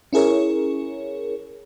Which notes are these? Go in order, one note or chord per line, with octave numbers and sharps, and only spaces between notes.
C#4 E4 G#4 A#4 C#5